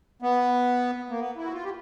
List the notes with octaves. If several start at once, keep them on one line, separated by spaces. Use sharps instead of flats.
B3
A#3
B3
E4
F#4
F4
G4